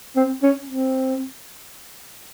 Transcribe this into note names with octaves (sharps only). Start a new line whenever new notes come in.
C4
C#4
C4